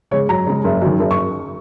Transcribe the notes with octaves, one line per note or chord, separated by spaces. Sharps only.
C#3 G#3 C#5
F#2 A#5
C#3 G#3
F#1
F#2 D#3
F#1
C#6